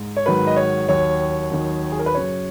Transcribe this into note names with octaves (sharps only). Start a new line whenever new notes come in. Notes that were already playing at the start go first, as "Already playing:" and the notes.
Already playing: G#2
C#5
G#2 D#3 F#3 B4
D#5
C#5
D#2 D#3 F#3 C#5
D#2 D#3 F#3
G#4
A#4
B4
F#2 C#3 F#3 C#5